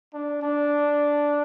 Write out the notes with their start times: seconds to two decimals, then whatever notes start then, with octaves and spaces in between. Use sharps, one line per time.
0.14 D4
0.42 D4